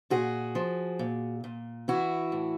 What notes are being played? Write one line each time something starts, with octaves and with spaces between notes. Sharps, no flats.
A#2 F#4 G#4
F3
A#2
A#2
E3 E4 F#4
A2